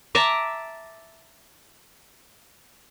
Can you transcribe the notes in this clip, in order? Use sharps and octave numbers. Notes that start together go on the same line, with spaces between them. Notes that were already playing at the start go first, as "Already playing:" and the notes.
E5 A5 A#5 D6